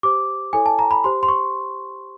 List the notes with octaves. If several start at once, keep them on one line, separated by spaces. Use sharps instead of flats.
G4 C5 D6
E4 A4 C#5 G#5
A5
A#5
B5
G4 C5 C6
C6
C#6